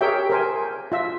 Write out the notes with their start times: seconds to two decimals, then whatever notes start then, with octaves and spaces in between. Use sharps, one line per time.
0.01 G4 G#4 A#4 C#5 E5 G5
0.30 A#4 C5 G#5
0.92 F4 E5